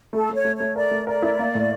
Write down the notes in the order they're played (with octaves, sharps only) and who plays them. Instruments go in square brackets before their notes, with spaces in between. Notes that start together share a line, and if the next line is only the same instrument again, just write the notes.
[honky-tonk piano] A3 [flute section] A4
[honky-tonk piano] A3 [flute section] C#5
[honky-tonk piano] A3
[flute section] C#5
[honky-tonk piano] A3
[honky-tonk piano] A#4 [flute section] D5
[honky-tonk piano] A3
[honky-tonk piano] A#4 [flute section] D5
[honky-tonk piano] E4
A#3
A2